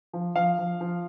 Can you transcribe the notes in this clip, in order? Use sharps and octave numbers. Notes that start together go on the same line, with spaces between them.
F3
F3 F5
F3
F3